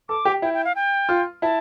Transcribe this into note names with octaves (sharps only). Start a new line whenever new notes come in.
A4 D6
G4
E4 G5
G5
F5
G5
F4
E4 A5